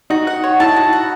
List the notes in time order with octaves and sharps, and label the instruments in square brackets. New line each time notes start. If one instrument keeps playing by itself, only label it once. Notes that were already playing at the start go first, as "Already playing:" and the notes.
[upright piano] D#4 [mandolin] F#4
[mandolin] F#5
C#5
[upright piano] E4 [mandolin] A5
[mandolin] F#4
F#5